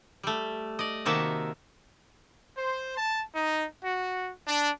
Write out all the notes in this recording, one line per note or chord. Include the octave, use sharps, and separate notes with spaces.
G3 A3
D5 D#5
C3 D#3 A#3 F#4 E5 A5
C5
A5
D#4
F#4
D4